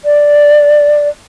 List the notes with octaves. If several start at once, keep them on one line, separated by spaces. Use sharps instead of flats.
D5